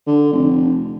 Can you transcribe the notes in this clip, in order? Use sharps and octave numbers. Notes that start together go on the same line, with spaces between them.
D3
F1